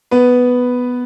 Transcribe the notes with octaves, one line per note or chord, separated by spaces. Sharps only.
B3 B4